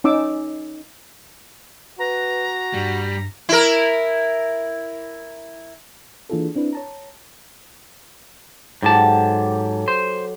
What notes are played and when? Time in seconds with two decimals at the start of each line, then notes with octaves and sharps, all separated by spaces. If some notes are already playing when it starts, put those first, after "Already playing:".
0.04 C#4 D#4 D6 E6
1.99 F#4 B4 A#5
2.74 G2 G3
3.49 E4 A#4
6.30 E3 A#3 D4 F4 G#4 A4
6.55 C4 D4 E4 B4
6.73 C#5 A5 A#5
8.83 G#2 F#3 G4 A4 A5
9.88 C5